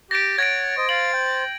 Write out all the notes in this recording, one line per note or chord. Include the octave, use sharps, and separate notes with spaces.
G4 A6 A#6 D7
C#5 F#5 G#6 A#6 D7
C5 D#5
F5 A6 F#7
G5